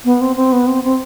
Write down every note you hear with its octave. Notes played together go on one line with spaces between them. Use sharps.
B3
C4
C4
B3
C4
C4